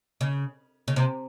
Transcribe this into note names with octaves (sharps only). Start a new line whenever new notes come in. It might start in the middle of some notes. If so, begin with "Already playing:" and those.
C#3
C#3
C3